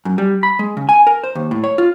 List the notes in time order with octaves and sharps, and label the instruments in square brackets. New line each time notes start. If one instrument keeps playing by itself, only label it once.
[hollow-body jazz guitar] F#2
G3
B5
G#3
C#3
G#5
A#4
C5
D#2
A2
C#5
F4